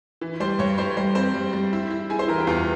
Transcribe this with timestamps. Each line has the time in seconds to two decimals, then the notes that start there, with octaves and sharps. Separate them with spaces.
0.21 E3
0.40 G3 C5 C6
0.59 G2 C#5 C#6
0.78 G3 C5 C6
0.97 G3 C5 C6
1.15 C4 C5 C6
1.34 G3
1.53 G3
1.73 E4
1.90 E4
2.10 E4 G#4 G#5
2.19 C5 C6
2.28 E3 A#4 A#5
2.38 G4 G5
2.47 E2 F4 F5